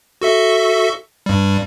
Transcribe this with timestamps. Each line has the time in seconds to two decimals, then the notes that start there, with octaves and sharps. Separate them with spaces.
0.21 F#4 A4 E5
1.26 G2 G3